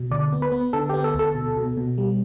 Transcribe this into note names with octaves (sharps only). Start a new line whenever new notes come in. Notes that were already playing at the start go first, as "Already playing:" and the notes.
Already playing: B2
D2 D5
B3
B4
B3
D3 A4
G4
B3
A4
D2 A4
B2
B2
B2
G3